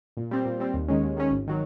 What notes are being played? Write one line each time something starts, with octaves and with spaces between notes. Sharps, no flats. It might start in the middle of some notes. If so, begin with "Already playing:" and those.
A#2
G3 C4
A#2
G3 C4
D#2
D#3 G#3 C#4
D#2
D#3 G#3 C#4
G#1
D#3 F#3